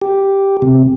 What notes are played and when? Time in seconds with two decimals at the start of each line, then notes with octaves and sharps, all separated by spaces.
0.02 G4
0.62 C3